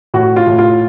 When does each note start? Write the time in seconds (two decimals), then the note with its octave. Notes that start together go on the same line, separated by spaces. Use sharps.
0.14 A2 F#4
0.36 F4
0.47 A2
0.58 F4